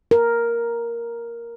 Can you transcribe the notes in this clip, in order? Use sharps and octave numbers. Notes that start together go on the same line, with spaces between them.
A#4